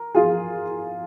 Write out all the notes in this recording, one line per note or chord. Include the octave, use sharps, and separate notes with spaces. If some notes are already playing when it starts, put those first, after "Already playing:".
Already playing: A#4
F4 G#4